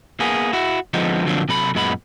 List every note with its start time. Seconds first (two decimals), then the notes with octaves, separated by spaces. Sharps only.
0.20 A#3 B3 G#4
0.53 E4 F#4
0.94 D3 F3 G#3 B3 C4 D#4
1.27 D3 F3 F#3 A#3 C4 D4
1.49 C3 F#3 A4 B5
1.75 F#2 A#2 G#3 B3 B5